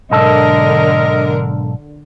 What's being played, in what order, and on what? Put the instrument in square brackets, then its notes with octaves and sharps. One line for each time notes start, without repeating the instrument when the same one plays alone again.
[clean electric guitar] B1 G#2 A4 [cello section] D3 A#4 [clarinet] D#5